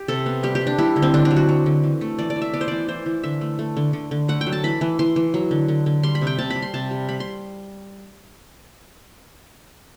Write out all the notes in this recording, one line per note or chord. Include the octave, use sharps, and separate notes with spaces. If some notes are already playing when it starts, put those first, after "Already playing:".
Already playing: G4
C3 A4
B3
G3 G4
G4
G3
D4
G3 E4
D3
C4
D3 D4
D4
F#3
F#4
F#3
D3
E3
A3
E3 D5
D5
E3
E5
B3 D5
C5
E3 D5
E3 C5
E3
D3 E5
A3
A3
D3
D3
D3
A3 F#5
G5
F#3
A5
E3 B5
E3
E3 C6
E3
F#3
D3
D3
D3
G3 C6
B5
C3
G5
C3 A5
B5
G3
C6
C3 A5
G3
G3 B5
C6